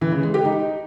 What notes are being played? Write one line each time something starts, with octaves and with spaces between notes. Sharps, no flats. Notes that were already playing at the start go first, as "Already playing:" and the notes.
E3
C#3
G#3
G4
D#4